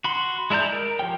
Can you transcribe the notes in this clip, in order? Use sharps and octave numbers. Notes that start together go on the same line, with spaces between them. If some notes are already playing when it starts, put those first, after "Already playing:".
F#4 B5 C6
G#3 E4 D5 A#5 G6
A#4
F3 G4 C#5 G5